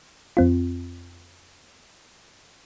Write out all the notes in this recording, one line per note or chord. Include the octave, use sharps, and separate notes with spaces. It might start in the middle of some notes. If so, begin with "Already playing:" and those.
F2 C4 F4